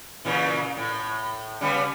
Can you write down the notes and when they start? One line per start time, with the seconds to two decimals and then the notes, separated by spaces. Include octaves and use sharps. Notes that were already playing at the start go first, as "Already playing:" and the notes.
0.25 A#2 C#3 E3
0.77 A2
1.61 C#3 G3 B3